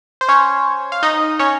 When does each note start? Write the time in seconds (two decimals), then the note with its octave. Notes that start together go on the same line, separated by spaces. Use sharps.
0.21 C5
0.28 C#4 C#5
0.92 F5
1.03 D#4 D#5
1.39 C#4 C#5